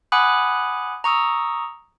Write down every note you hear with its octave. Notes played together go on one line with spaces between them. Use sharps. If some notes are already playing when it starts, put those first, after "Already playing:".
F#5 G#5 B5 D6 D#6 F#6
A#5 C#6 D#6 E6